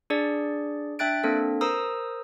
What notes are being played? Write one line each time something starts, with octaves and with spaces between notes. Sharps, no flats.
D4 G#4 D5
D4 E5 G5 F#6 A6 D7
A#3 C4 D4 A4
A#4 C5 A#5 D#6 E6